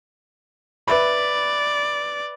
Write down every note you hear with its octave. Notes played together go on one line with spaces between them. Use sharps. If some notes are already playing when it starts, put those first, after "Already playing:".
B4 D5 E5 B5